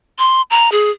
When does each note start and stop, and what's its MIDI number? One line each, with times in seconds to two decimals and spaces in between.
0.19 0.42 84
0.51 0.70 82
0.72 0.91 68